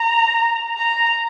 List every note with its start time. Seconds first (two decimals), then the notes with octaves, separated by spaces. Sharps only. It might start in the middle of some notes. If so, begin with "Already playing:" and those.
Already playing: A#5
0.78 A#5